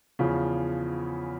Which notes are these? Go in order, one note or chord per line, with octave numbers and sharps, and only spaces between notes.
E2 C#3 F3